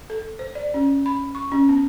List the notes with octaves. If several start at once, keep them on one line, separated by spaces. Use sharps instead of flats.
A4
C5
D5
C#4
B5
C#6
C#4
B3